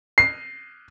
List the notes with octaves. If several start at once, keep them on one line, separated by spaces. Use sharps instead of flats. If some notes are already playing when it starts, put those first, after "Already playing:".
C7